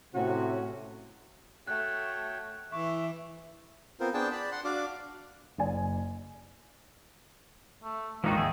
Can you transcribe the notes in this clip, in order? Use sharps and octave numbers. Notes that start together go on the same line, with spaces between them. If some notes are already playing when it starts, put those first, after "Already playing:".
A2 C3 C#4 F#4
A3 F#4 C#5 G5 F#6
E3 E5 C#6 D6
B3 C4 F4 A#4 C5
B3 D4 G#4 C5 G5 A5
D5 A5 B5
F#5 C6
D4 F#4 D5 F5 D6
F#1 D5 G#5
A3
A1 D#2 D#3 F3 G#3 D4 D#4 F#4
G#4 E5